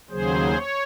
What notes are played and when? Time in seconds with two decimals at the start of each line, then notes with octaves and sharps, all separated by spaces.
0.10 D#2 C#3 F#3 G#4 C5
0.55 C#5